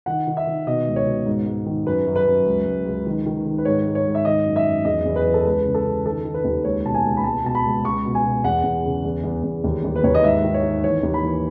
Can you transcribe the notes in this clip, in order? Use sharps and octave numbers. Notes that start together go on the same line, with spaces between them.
D#3 F#5
D#3
E5
D#3
B2 D#5
C#2
C#5
B2
G#2
G#2
D#3
F#2 B4
F#2
B4
F#2
C#2
C#2
C#2
D#3
D#3
D#3
B4
G#2 C#5
G#2
C#5
G#2
E5
D#3 D#5
F#2
E5
F#2
E2 D#5
E2
B4
E3
A4
C#2 B4
C#3
A4
C#3
D#3 A4
D#3
B4
D#2
C#2 C#5
B2 A5
G#5
C#2
B5
C#2 A5
B2 A5
B5
C#2
C#2 C#6
B2
G#5
B2
E2 F#5
E2
C#3
E2
E2
E2
D#2
D#2
B4
D#2 C#5
D#5
G#2 E5
D#3
C#5
D#3
E3 C#5
D#2
B5
E3